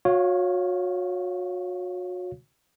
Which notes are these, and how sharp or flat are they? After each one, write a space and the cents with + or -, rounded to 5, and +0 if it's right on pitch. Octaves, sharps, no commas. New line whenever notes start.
F#4 -35 C#5 +0 F5 +0